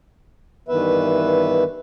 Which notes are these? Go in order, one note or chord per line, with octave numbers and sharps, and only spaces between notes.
G2 D#3 E3 B3 B4 E5